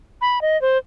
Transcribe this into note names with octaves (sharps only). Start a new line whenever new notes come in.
B5
D#5
C5